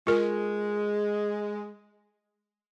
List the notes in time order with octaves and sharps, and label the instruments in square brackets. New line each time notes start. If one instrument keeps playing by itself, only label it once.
[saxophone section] G#3 [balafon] F4 A#4